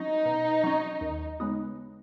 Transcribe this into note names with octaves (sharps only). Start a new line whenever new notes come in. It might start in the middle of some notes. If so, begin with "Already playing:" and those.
Already playing: F#3 C#4 D#4
B2
F#3 C#4
D#2
C#3 G#3 B3 D#4